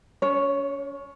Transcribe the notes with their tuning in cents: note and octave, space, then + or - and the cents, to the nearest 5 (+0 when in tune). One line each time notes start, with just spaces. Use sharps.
C#4 +40 C#5 +0